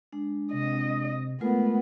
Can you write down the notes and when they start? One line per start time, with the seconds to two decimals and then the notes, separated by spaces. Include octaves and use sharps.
0.12 G#3 D4
0.52 C3 D#5
1.41 G#3 A3 B3 F4 A#4